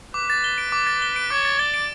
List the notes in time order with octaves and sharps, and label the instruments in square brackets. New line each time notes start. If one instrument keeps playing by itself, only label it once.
[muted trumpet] B4 [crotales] D6
[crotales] A6
G7
D7
D6
A6
G7
D7
[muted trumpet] C#5 [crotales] D6
[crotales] A6
[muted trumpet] D5 [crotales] G7
[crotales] D7